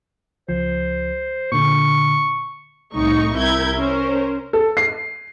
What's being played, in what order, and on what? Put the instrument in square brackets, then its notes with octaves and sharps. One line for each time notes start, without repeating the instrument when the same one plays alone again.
[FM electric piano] C#2 F3 [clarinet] C5
[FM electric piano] A#2 D3 [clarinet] C#6
[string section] C2 A2 D#4 C#6
C2 C3 E4 A#4 G6 G#6
C#4 A#4 C5
[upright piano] A4
C7